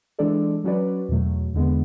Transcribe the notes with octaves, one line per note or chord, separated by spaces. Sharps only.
E3 G#3 D4 A4 D5
F#3 C#4 F#4 B4 D5
E2 B2 F#3 A3
E2 D3 G#3 B3